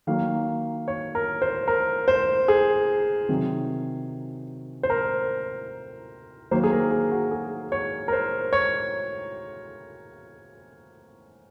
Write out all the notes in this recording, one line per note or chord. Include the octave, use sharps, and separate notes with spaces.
D#3 F#3 A#3 F5
C#5
A#4
C5
A#4
C5
G#4
C3 D#3 F#3
C5
A#4
D#3 F#3 A#3 C5
G#4
A#4
G#4
F#4
G#4
C#5
A#4
C5
C#5